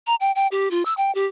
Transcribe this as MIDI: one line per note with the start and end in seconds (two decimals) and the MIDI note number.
0.07 0.15 82
0.20 0.32 79
0.35 0.47 79
0.51 0.71 67
0.71 0.83 65
0.85 0.94 88
0.97 1.13 79
1.15 1.26 67